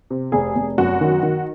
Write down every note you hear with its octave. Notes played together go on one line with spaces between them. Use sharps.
C3
F1 G#4
F1
F#2 F#4
D#3
D#3